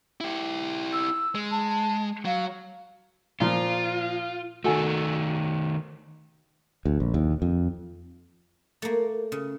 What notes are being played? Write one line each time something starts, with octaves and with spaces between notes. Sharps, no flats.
E4 G4
E6
G#3
A5
F#3 F5
A#2 F3 F4
D#3 A3 F#4 A4 G#5
D2
A#1
D#2
F2
A3 A#3
C#3